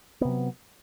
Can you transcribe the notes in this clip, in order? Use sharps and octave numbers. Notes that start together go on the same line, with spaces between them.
C3 F#3 B3